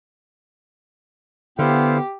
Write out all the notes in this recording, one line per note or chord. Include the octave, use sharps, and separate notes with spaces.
D3 B3 E4 G4 C5 F5